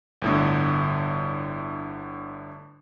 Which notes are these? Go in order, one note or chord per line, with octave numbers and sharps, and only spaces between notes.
G1 A2 D3